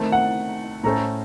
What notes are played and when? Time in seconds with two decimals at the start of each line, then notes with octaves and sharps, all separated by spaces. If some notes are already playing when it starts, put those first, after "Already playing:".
Already playing: D#3 A3 C4 A5
0.12 F#5
0.83 A2 A3 C#4 A4 C5 A#5